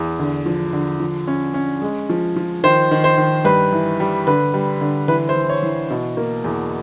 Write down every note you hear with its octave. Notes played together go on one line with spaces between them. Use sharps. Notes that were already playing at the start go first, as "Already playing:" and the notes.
Already playing: E2
D3
F3
D3
F3
C#4
C#4
G#3
F3
F3
D#3 C5
D#3
C5
D#3
G2 B4
E3
G3
D3 B4
G3
D3
E3 B4
C5
E3
C#5
E3
B2
A#3
E2